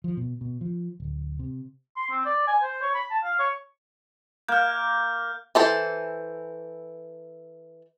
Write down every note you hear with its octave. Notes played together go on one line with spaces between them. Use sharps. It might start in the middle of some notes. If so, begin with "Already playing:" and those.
F3
B2
B2
F3
D1
C3
C6
C4
D5
G#5
C5
C#5
B5
A5
F5
C#5
A#3 F6 G6
E3 A4 C5